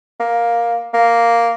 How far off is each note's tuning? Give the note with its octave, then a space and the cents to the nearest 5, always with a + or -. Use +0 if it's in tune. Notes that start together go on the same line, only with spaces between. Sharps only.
A#3 +10
A#3 +0